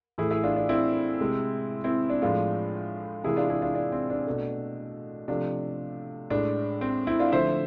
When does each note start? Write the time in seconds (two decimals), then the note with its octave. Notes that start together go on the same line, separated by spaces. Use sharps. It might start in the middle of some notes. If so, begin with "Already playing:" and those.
0.18 A2 E3 A3 E4 G#4
0.31 E4 G#4
0.43 D4 F4
0.56 D4
0.69 C4 E4
1.20 C3 G#3
1.84 C4 E4
2.10 D4
2.22 A2 F3 G#3 D4 F4
3.24 C3 E3 G#3 E4 G#4
3.37 D4 F4
3.50 E4 G#4
3.62 D4 F4
3.75 D4
3.92 C4
4.10 D4
4.26 B2 A3
5.28 C3 F3 A3 D4
6.30 A2 G#3 D4
6.81 C4
7.07 C4 E4
7.19 D4 F4
7.32 D3 F3 A3 C5 E5